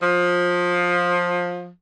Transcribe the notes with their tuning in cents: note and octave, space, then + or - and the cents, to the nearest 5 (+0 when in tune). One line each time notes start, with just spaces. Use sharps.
F3 +20